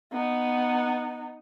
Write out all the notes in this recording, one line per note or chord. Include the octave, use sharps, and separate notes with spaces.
B3 D#4